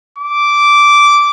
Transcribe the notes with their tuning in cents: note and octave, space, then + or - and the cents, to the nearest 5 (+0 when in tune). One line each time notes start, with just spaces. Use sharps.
D6 -10